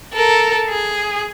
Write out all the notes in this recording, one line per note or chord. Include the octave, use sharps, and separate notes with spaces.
A4 A#4
G#4